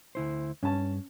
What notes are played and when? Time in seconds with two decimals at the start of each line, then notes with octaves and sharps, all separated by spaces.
0.15 D2 E4 C5
0.63 G2 C#4 A5